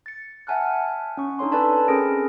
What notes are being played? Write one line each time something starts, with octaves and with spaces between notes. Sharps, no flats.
A6 C#7
E5 F#5 G#5 A5 F6 F#6
C#4 C#6
D4 D#4 A4 C#5 C6
A4 B4 D5 G#5 A5 B5
C4 C#4 G#4 A#4 A#6 D7